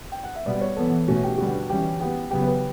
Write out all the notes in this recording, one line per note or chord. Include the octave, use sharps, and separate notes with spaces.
G5
F#5
E5
B2 G3 B3 D5
C#5
E3 B3 A4
B2 A3 C#4 F#4
G4
D3 G3 B3 F#4
E3 G3 C#4 G4
E3 B3 G4
C#3 F#3 B3 G4
B4